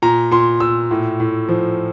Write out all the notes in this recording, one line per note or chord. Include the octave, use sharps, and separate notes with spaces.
A#2 A#5
A#2 C6
A#2 E6
A2
A2
F3